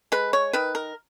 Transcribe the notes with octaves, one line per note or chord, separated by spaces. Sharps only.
G#3 B4
C#5
D#3 B4
A#4